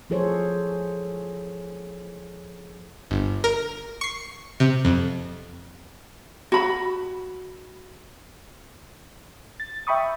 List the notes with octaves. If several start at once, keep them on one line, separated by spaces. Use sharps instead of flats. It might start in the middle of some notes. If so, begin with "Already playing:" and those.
F3 E4 G#4 A4 C5 C#5
G1
A#4
C#6 C7
C3
F2
F#4 B5
A6
E5 G5 B5 C#6 D#6